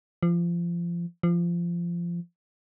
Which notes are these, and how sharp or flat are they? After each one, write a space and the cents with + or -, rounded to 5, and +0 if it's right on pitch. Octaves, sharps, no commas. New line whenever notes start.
F3 -25
F3 -20